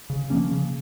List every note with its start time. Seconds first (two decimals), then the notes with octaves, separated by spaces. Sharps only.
0.10 C#3
0.30 F3 A#3 C#4
0.51 C#3